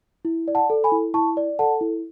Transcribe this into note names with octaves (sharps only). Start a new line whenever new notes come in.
E4
D5
F#5 A5
A4
G#5 B5
E4
E4 A5 C#6
D5
A4 F#5 A5
E4